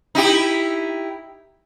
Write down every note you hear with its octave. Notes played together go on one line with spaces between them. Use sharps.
D#4 E4 G4